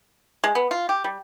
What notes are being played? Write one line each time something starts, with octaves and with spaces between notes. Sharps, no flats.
G#3
B3
F4
G4
G3